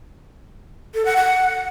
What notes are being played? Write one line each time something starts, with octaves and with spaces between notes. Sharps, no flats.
A4
F#5
F#5